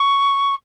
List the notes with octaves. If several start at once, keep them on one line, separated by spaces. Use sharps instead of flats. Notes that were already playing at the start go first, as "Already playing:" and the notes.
Already playing: C#6